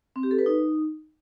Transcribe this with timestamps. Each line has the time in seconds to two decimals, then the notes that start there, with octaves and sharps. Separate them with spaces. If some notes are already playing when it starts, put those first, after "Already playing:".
0.16 C4
0.23 G4
0.31 A4
0.39 B4
0.46 D#4